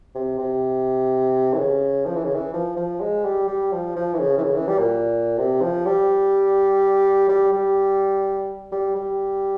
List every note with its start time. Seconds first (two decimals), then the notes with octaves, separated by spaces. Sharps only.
0.15 C3
0.38 C3
1.54 E3
1.58 C#3
2.06 F3
2.15 E3
2.24 C#3
2.34 E3
2.53 F3
2.76 F3
3.01 G#3
3.25 G3
3.48 G3
3.72 F3
3.96 F3
4.13 E3
4.19 C#3
4.38 E3
4.43 C#3
4.55 E3
4.67 G3
4.79 A#2
5.38 C3
5.62 F3
5.86 G3
7.29 G3
7.52 G3
8.72 G3
8.95 G3